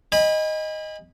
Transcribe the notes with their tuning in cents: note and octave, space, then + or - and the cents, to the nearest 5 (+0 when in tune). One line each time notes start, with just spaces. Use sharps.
D#5 +0 G#5 -40 B5 -10